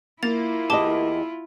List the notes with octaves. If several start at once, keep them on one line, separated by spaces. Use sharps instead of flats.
A#3 E4 F4 A6 F7
E2 G4 D#5 A5 D6 G7